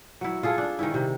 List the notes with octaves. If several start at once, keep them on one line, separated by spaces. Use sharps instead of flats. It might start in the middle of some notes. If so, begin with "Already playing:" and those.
F#3 E4
F4 G#4 A4
D4
D#3 C#4 E4
C3